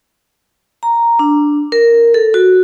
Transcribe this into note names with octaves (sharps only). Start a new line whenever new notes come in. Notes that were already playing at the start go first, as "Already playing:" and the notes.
A#5
D4
A#4
A4
F#4